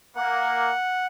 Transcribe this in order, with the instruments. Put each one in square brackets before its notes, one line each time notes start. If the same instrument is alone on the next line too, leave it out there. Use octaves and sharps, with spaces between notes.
[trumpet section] A#3 [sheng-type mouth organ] F#5